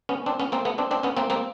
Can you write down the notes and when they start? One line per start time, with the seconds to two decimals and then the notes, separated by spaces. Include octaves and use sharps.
0.09 B3 C#4
0.26 C4 D4
0.40 B3 C#4
0.52 A#3 C4
0.65 A3 B3
0.78 C4 D4
0.91 C4 D4
1.03 B3 C#4
1.17 A#3 C4
1.30 A#3 C4